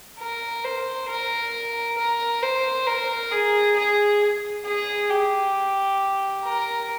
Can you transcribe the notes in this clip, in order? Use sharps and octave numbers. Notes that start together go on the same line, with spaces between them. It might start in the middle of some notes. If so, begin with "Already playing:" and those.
A#4
C5
A#4
A#4
C5
A#4
G#4
G#4
G#4
G4
A#4